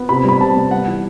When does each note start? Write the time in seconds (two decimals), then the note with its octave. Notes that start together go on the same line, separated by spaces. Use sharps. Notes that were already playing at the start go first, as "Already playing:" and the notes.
Already playing: B3
0.09 C3 B5
0.25 G3 B5
0.41 C3 A5
0.56 B3
0.71 G3 F#5
0.87 E3